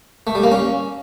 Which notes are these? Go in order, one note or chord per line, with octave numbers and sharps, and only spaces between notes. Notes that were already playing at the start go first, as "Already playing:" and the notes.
A3
G3
A#3
C#4